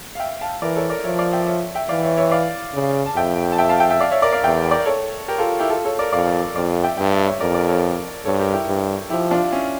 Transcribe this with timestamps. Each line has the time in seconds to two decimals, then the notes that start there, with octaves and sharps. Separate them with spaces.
0.15 F5
0.19 E5 G5
0.41 F5 A5
0.62 E3 A#4 D5
0.76 A4 C#5
0.90 A#4 D5
1.04 F3 C#5 E5
1.19 D5 F5
1.33 E5 G5
1.47 C#5 E5
1.75 E5 G5
1.89 E3 D5 F5
2.03 C#5 E5
2.17 C#5 E5
2.31 D5 F5
2.74 C#3
3.06 A5
3.16 F2 E5 G5
3.52 A5
3.58 E5 G5
3.69 F5 A5
3.80 E5 G5
3.90 E5 G5
4.01 D5 F5
4.11 C#5 E5
4.22 A#4 D5
4.33 D5 F5
4.43 E2 E5 G5
4.71 A#4 D5
4.86 A4 C#5
5.28 G4 A#4
5.38 F4 A4
5.59 E4 G4
5.70 F4 A4
5.85 A4 C#5
5.99 A#4 D5
6.12 F2 D5 F5
6.55 F2 D5 F5
6.84 E5 G5
6.97 G2 E5 G5
7.12 E5 G5
7.26 C#5 E5
7.40 F2 A#4 D5
7.54 A#4 D5
7.68 A4 C#5
8.25 G2 A4 C#5
8.39 G4 A#4
8.53 E4 G4
8.67 G2
9.10 F3 E4 G4
9.31 D4 F4
9.52 C#4 E4